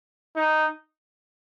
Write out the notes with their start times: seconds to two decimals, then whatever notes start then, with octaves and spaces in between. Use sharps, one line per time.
0.36 D#4